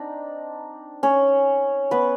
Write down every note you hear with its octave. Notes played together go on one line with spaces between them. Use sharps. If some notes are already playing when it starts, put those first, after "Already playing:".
Already playing: C4 D4 D#4
C#4 C#5
B3 B4